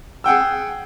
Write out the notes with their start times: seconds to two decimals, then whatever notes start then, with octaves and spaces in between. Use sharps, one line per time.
0.24 G#4 F#5 G5 E6